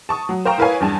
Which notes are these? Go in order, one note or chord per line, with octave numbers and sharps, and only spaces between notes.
A5 C#6 D#6
F#3
C5 F5 G5 A#5 C#6
E4 A#4 B4 C#5 F5 G#5
E2 G2 G#5 A5